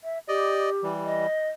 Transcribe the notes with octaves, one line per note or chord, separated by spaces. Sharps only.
E5
G4 D5 D#5
E3 G3
D#5